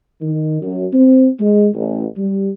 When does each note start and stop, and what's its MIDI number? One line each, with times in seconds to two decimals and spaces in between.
0.21 0.58 51
0.62 0.86 42
0.93 1.29 60
1.39 1.67 56
1.73 2.04 33
2.16 2.50 55